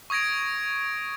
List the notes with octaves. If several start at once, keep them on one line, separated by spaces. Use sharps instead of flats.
C#6 D#6 G#6 A#6 D7